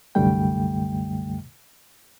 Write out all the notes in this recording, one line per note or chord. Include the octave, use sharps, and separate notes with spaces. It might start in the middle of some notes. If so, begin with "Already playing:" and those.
C2 F#2 D3 G3 A3 G5